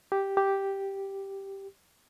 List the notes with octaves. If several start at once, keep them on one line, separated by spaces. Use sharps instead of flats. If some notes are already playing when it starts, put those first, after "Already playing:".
G4
G4